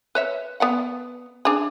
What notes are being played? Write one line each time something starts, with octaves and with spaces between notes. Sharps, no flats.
B4 C#5 E5
B3 D5 F#5
D4 G#4